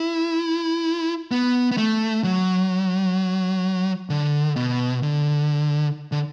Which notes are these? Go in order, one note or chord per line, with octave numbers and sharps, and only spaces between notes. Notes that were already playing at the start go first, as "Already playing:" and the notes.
Already playing: E4
B3
B3
A3
F#3
D3
B2
D3
D3